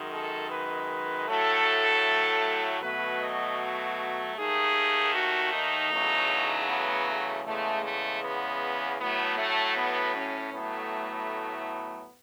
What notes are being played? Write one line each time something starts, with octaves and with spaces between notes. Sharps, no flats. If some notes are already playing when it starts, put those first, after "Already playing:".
Already playing: F#2 D#3 G#3
A4
B4
A2 F#3 A3 A4
B2 F#3 A3 B4
D#5
D#2 D#3 A3 G#4
F#4
D#4
E2 C#3 F#3 A3
B3
A3
E2 C#3 G#3 A3
A3
B3
A2 F#3 A3 B3
A3
B3
C#4
A2 F#3 A3 B3